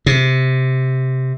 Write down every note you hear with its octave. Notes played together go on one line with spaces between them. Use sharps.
C3